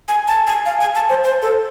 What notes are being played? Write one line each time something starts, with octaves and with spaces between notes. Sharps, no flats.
G#5
A5
G#5
F5
G#5
A5
C5
C5
A4